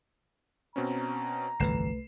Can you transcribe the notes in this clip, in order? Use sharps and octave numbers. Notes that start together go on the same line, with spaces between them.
B2 C4 C#4 A#5
G1 C2 F2 E3 A3 B4 C7 E7